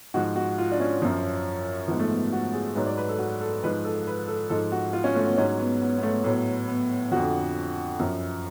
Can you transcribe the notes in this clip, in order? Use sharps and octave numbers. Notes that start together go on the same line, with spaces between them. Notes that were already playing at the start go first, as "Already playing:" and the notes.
G#2 F3 F#4
F#4
F4
D4
C#4
F#2 F3
G#2 F3 B3
A3
B3
F#4
G#4
G#2 F#3 B4
D5
B4
A4
F#4
A4
G#2 F3 B4
A4
B4
A4
G#2 F3 A4
F#4
F4
C#4
A3
B3
G#2 F#3 C#4
B3
B3
B3
A3
A2 F#3 B3
B3
F2 D3 F3 F#4
F#2 F3